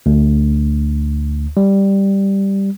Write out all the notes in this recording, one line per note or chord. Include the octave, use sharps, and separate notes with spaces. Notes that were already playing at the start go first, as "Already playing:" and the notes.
D2
G3